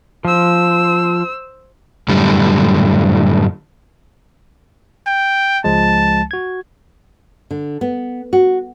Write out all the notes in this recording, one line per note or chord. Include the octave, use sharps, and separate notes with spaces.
F3 C5 E6
F#2 A2 D3 G3
G5
C#2 F3 G#3 A5
F#4 G#6
D3
B3
F#4